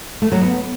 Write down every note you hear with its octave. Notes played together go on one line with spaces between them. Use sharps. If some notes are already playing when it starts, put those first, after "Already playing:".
A3
F#3
B3